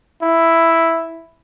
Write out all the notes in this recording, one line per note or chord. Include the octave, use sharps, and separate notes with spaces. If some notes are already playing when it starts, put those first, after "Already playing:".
E4